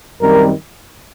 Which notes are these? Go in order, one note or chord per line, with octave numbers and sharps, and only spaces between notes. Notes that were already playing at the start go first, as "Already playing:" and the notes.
F#2 D#3 G3 C4 A#4